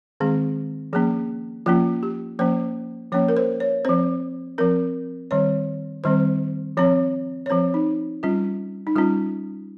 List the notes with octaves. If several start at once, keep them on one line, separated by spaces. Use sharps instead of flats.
D#3 G#3 C4 G#4
F3 A#3 C#4 G#4
F3 A#3 C#4 F4
G4
F3 A#3 C#4 C5
F3 A#3 C#4 C#5
A#4
C5
C#5
F3 C4 C5
F3 C4 A#4
D#3 G3 C4 C#5
D#3 G3 C4 C5
F3 C4 C#5
C#5
F3 C4 C5
D#4
G3 C#4 F4
D#4
G3 C#4 F4